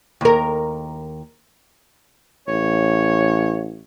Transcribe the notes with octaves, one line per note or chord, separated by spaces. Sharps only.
D#2 A#4
A1 C#5